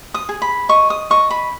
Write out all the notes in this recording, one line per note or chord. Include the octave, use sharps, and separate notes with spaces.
D#6
G#4
B5
D#5 C#6
D#6
D#5 C#6
B5